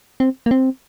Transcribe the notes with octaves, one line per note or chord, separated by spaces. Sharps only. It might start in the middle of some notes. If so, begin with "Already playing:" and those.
C4
A#3
C4